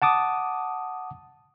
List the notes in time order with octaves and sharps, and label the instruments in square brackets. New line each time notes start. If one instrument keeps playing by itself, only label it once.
[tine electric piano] F#5 A5 D6 D#6